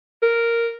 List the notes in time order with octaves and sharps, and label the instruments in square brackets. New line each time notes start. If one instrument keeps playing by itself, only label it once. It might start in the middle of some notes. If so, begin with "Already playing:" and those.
[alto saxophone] A#4